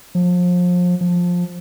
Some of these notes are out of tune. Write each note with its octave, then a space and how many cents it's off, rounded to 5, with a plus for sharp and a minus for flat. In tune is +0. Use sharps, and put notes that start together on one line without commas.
F3 +30
F3 +15